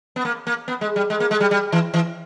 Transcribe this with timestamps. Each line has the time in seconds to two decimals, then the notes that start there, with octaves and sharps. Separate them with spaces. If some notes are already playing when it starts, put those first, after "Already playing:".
0.16 B3
0.25 A#3
0.47 A#3
0.68 B3
0.81 G#3
0.96 G3
1.10 G#3
1.20 A#3
1.31 G#3
1.40 G3
1.51 G3
1.72 E3
1.94 E3